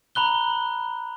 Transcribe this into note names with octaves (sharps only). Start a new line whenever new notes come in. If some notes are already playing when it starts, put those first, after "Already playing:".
A#5 B5 F#6 G7